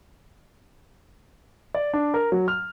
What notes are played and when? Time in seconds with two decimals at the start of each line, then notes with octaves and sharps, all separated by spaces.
1.74 D5
1.94 D4
2.14 A#4
2.32 F#3
2.48 F6